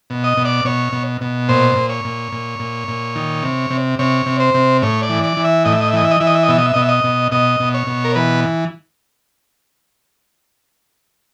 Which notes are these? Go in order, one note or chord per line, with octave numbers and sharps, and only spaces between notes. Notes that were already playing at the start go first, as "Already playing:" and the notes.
B2
D#5
B2
D5
B2 C#5
B2
B2
A#2 C5
A#2
C#5
A#2
A#2
A#2
A#2
D#3
C3
C3
C3 C#5
C3
C5
C3
A2 C#5
D5
E3
D5
E3
E5
A2 D#5
E5
D#5
E5
E3 D#5
E5
D#5
E3 E5
D#5
E5
D#5
B2 E5
D#5
E5
B2 D#5
E5
D#5
B2
B2 D#5
B2
C#5
B2
A#4
E3 B4